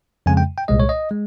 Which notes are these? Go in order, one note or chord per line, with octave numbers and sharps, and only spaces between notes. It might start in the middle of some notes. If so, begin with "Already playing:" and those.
F2 C#3 G#3 G#5
G5
G5
C2 A#2 G#3 D#5
C#5
D#5
G#3